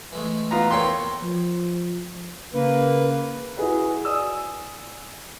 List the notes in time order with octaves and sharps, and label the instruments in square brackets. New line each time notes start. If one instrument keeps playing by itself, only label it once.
[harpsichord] E3 G#3 A3
[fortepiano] B3 F4 A#5
[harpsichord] A#3 A4 B4 [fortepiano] C#5 G5 C6
[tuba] F3
[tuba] C#3 [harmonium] A#3 B4
[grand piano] E4 F#4 G#4 B4
D5 G#5 D#6 E6